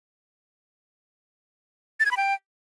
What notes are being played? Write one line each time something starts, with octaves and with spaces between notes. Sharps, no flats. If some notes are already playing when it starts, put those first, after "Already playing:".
A6
G#6
B5
G5